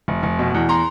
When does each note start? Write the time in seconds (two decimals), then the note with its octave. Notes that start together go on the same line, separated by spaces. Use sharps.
0.08 F1
0.23 F1
0.39 B2
0.54 E2
0.69 A#5 C6